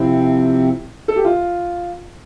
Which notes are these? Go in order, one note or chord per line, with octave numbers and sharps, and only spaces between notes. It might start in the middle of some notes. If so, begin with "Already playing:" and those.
Already playing: C3 F3 C4 E4
A4
G4
F4